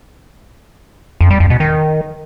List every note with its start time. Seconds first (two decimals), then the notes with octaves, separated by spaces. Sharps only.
1.21 F2
1.30 G3
1.40 F2
1.50 B2
1.60 D#3